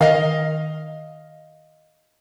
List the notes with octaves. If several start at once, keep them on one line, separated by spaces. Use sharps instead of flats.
D#3 D#5 F5